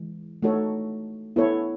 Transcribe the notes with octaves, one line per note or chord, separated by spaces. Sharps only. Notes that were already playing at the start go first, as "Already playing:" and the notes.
Already playing: E3 G#3
A3 D#4 F#4 A4 C#5
B3 E4 A4 C#5